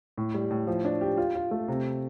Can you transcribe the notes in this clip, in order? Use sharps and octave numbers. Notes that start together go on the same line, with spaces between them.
A2
G3
A2
F3
D4
G4
F4
F4
A3
C3